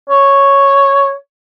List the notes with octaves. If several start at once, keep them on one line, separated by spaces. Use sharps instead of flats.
C#5